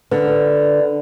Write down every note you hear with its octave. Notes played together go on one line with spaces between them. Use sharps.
D3 B4